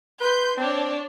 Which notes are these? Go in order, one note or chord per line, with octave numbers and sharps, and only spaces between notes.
B4 C6 G6
C4 D4 C#5